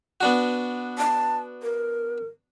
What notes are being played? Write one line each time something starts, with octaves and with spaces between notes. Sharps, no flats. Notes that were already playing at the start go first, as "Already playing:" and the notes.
B3 D4 F#4
A5
A#4